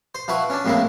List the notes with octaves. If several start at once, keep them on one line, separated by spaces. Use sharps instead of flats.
C5
F3 E4 B4 F#5 C#6
C#4 D4
F2 A2 G#3 A#3 E4